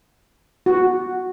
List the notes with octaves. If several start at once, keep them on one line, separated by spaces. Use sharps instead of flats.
F#4